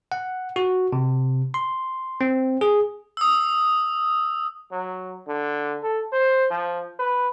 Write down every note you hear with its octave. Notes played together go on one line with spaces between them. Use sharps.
F#5
F#4
C3
C6
C4
G#4
D#6 E6
F#3
D3
A4
C5
F3
B4